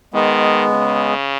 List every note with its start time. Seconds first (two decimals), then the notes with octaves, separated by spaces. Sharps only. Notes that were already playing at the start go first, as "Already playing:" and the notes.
0.14 D#3 G#3 B3
0.70 C#3